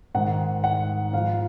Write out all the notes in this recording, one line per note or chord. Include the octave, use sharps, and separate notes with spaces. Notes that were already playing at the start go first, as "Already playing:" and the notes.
G#2 D#3 F#5
F#5
G#2 F3 F5